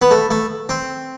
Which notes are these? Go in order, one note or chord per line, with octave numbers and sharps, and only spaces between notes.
B3
A3
A3
C4